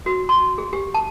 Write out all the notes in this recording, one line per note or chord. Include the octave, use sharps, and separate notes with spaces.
F#4
C6
G#4
G4
A5